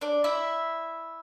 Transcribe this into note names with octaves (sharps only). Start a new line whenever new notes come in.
D4 D5
E4 E5